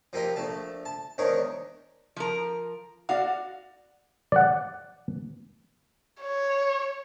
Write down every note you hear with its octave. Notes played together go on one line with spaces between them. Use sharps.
F3 A#3 G4 D#5
A#1 A3 A5
A5
E2 G#2 D#3 D4 C#5 C#6
F3 A#4
F#4 D5 F5
D5 F#5
C#5